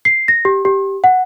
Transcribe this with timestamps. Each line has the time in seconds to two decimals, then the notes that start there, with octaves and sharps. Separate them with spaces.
0.05 C7
0.28 A#6
0.45 G4
0.65 G4
1.04 F#5